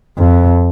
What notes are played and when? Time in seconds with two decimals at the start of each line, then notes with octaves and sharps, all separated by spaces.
0.18 F2